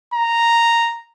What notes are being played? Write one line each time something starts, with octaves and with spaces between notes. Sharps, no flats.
A#5